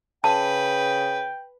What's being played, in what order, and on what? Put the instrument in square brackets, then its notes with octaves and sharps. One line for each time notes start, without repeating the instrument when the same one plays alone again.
[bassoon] C#3 [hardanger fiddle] B4 [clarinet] G5 [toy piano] A5